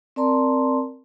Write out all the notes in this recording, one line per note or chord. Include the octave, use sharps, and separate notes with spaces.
C4 A#4 D5 A5 A#5 C6